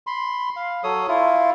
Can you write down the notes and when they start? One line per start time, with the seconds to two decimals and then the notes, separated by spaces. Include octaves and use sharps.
0.07 B5 C6
0.56 F5
0.84 F#3 A4 C#5 D#6
1.08 E4 F4